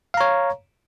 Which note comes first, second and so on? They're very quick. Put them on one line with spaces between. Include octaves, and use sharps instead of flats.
F5 A#5 C#5